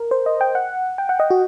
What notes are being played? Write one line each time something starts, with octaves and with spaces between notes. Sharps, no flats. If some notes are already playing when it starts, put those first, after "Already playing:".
Already playing: A#4
C5
D#5
G5
F#5
G5
F#5
D#5
F#4